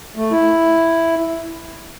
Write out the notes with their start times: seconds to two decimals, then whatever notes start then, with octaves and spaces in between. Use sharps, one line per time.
0.16 A3
0.31 E4